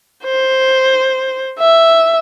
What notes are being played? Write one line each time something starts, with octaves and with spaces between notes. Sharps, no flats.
C5
E5